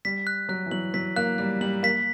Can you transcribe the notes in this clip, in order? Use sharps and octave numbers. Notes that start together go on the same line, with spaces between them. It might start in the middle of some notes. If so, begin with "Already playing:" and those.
G3 B6
F#6
F#3 F#6
E3
F#3 F#7
F#3 B6
A#3 F#6
G3 F#6
G3 F#7
A#3 B6